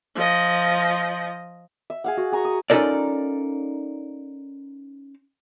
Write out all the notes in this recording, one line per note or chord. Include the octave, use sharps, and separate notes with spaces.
F3 D#5
E5
G#4 F5 F#5
F#4
G#4 A#5 C#6
D#6
C#4 D#4 F4 A4 A#4 D5